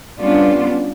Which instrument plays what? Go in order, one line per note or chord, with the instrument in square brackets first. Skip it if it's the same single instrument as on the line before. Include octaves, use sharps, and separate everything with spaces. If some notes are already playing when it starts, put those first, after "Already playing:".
[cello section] G3 B3 C#4 D4 F4